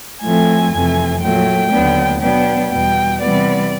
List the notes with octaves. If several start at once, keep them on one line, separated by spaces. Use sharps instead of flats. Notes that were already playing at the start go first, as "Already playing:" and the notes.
A2 F3 A3 C4 G#5
F2 C3 E3 A3
A#2 F#3 A3 G5
D#2 D3 F#3 B3 D4
B2 F#3 B3 D4 G5
E2 B2 G3 G5
C3 E3 G3 B3 D5